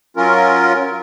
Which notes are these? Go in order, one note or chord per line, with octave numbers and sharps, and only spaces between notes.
F#3 C#4 F4 A#4